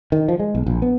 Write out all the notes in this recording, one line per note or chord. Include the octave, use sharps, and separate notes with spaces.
D#3
F3
G#3
B1
A#1
B3